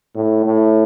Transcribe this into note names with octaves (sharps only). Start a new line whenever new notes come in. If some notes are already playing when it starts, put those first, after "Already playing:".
A2
A2